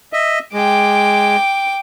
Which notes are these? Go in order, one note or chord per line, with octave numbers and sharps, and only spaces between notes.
D#5 E5
G#3 G5 D6